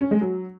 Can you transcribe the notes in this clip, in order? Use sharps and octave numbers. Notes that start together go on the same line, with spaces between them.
C#4
G#3
F#3